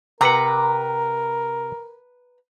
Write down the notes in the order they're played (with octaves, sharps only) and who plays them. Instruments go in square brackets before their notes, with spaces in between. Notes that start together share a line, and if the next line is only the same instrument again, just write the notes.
[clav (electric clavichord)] C3 F#5 [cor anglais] A#4 [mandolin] B4 A#5